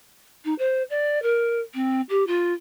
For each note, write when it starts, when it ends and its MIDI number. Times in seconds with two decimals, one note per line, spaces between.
0.45 0.54 63
0.59 0.83 72
0.90 1.21 74
1.22 1.61 70
1.74 2.01 60
2.09 2.26 67
2.27 2.53 65